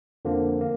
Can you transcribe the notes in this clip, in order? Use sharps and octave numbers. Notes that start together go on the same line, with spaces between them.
F2 D3 F3 A#3
A#3